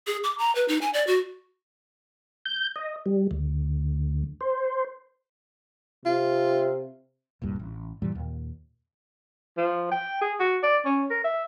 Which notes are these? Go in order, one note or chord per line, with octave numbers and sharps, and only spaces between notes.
G#4
D6
A#5
B4
D#4
G#5
D5
F#4
G6
D#5
G3
D2
C5
C3 F4
D#1 C2 G2 A#2
A1
F#2 A#2 E3 G3
D#2 A#2
F3
G5
G#4
F#4
D5
C#4
A#4
E5